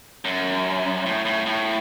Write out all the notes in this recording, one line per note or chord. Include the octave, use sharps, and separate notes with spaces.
F#2
A2
A2
A2